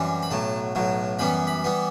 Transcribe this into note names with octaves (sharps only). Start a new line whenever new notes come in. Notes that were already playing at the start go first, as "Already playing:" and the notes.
Already playing: F#2 E3 G3 C4
B5
B1 A2 F#3 A5
B1 A2 F#3
F#2 E3 G3 B3 B5
B5
E3 G3 B3